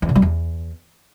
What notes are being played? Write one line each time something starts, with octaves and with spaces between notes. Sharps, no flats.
E2
B2
G3
E2